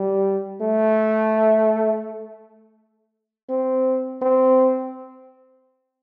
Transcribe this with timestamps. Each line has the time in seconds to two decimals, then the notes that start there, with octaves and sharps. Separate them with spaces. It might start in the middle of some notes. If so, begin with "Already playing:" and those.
Already playing: G3
0.61 A3
3.49 C4
4.22 C4